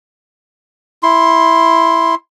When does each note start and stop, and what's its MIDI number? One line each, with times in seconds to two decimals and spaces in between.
1.03 2.15 64
1.03 2.15 84